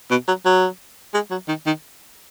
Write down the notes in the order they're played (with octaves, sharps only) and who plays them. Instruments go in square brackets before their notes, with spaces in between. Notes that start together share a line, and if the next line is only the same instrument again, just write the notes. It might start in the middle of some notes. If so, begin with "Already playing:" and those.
[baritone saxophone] B2
F#3
F#3
G#3
F#3
D#3
D#3